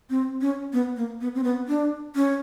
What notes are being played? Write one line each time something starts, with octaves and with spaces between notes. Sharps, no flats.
C4
C#4
B3
A#3
B3
C4
B3
D4
C#4